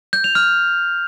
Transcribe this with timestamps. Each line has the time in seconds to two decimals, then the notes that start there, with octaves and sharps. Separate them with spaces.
0.13 G6
0.24 F7
0.35 F6